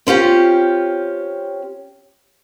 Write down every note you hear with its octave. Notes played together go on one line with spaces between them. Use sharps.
C4 C#4 F4 G4